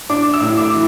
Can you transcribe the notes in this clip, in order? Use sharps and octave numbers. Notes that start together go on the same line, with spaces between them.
D4 D6
E6
A2
D6
E3